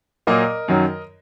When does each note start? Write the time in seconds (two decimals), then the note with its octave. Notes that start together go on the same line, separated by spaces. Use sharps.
0.27 A#2 F#3 A#3 A#4 D#5
0.68 F#2 D#3 F#3